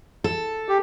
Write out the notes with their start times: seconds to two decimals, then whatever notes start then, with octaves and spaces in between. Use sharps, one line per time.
0.24 A4
0.69 G4